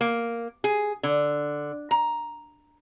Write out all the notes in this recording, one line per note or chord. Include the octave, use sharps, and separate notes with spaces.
A#3
G#4
D3
A#5